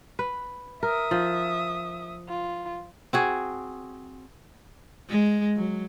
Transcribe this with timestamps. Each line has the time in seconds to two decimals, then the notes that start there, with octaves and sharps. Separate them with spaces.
0.19 B4
0.83 A#4 E5 D#6
1.11 F3
2.28 F4
3.13 C4 F#4 G#4
5.09 G#3
5.57 F#3